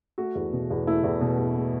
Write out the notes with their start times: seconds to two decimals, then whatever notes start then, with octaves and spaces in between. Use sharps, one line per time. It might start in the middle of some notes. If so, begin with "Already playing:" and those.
0.18 A3 F#4
0.35 E2
0.53 B2
0.70 E2
0.87 A3 E4
1.04 E2
1.21 B2
1.38 E2
1.56 A3